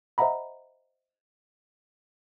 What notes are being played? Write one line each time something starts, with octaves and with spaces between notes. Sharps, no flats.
C5 D#5 E5 F#5 A#5 B5